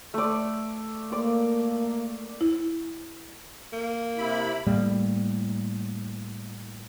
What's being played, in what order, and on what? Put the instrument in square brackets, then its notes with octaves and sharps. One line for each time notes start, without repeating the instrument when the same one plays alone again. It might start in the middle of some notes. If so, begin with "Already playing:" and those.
[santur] A3 D5
[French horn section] A#3 [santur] D5
[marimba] E4
[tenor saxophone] A#3
[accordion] C3 E4 B5
[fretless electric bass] A2 G3 A#3